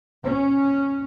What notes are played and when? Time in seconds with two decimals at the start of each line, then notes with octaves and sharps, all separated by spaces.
0.24 C#4